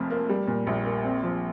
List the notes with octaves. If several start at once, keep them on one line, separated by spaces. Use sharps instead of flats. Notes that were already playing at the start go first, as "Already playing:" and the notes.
Already playing: F1 F2 F3
A#3
G3
A#2
A#1
A#3
C4
F3